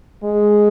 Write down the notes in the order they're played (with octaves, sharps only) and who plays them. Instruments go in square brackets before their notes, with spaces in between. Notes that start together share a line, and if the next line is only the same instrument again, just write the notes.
[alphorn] G#3